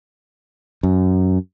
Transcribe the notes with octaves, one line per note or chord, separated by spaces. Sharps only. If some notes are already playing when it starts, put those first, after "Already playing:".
F#2